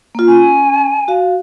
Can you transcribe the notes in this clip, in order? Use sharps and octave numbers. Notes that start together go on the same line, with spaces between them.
A#3 F4
C#4 G#5
F#4 F5